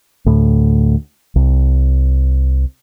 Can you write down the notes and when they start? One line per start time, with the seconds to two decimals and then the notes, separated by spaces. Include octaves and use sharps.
0.26 D2 A2
1.36 C2